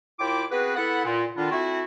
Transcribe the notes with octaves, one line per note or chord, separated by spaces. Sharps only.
D#2 E4 F4 G5 D6
B3 C4 F#4 G#4 B4
B3 E4 A4 F#5
A#2
D3 D#3 D4 E4 F4
A3 C4 E4 F#4